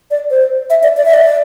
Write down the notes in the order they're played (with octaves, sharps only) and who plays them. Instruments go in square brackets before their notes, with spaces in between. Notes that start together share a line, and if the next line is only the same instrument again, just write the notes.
[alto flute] D5
C5
E5
D5
D5
E5
D5